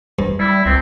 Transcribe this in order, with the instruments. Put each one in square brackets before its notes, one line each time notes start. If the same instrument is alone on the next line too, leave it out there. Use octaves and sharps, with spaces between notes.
[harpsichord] G2
[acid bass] G3 [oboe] E4
[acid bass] C#2 [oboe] C4